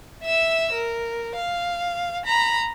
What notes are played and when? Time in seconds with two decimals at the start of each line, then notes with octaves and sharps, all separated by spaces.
0.24 E5 E6
0.73 A#4
1.36 F5
2.25 A#5 B5